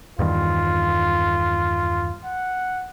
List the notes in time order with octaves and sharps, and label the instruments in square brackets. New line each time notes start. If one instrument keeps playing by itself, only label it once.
[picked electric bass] E2 G2 D#3 [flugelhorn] F4
[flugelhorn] F#5